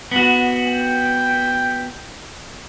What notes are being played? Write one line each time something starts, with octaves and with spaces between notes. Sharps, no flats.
B3 F#4
G5